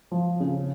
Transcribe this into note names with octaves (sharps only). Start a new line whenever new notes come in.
F3
C#3